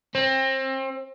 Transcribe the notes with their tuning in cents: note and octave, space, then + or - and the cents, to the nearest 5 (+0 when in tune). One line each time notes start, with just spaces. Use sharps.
C4 +30